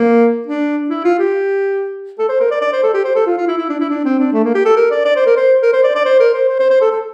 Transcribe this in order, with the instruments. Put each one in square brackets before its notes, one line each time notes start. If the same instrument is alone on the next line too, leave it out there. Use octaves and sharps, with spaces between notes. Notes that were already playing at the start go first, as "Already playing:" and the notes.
Already playing: [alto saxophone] A#3
D4
E4
F4
G4
A4
C5
A#4
D5
D5
C5
A4
G4
C5
A4
F4
F4
E4
E4
D4
E4
D4
C4
D4
A3
A#3
G4
A4
A#4
D5
D5
C5
A#4
C5
A#4
C5
D5
D5
C5
A#4
C5
C5
C5
C5
A4
A4